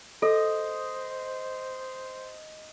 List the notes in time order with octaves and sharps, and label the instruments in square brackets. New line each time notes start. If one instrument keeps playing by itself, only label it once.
[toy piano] A4 [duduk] C5 [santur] D#5